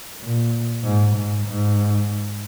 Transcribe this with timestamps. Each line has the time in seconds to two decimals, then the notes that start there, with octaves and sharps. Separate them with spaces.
0.21 A#2
0.84 G#2
1.15 G#2
1.46 G#2